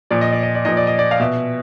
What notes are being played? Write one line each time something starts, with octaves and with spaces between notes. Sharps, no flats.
A#2 F3 D5
D#5
D5
D#5
D5
A#2 F3 D#5
D5
D#5
D5
F5
B2 E5